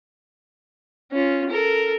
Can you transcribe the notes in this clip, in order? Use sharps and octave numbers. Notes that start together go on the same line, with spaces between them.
C#4 F4
A4 A#4